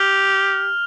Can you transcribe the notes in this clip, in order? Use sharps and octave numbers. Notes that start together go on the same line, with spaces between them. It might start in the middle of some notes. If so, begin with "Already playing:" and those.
Already playing: G4 F6 F7